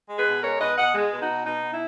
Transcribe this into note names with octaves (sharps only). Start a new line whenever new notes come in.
G#3
G#4 B4
B2
G#3 A#4 C#5
B2 B4 D#5
B2 D#5 F#5
G#3
B2
D#4 F#4
B2
B2 D#4
B2
E4